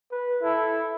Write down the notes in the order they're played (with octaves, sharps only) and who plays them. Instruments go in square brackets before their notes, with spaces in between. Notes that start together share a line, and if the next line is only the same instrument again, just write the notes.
[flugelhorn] B4
[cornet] E4 [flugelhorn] A4